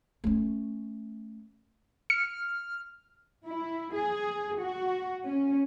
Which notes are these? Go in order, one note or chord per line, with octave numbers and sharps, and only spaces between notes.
A3 C#4
F6 C#7
E4
G#4
F#4
C#4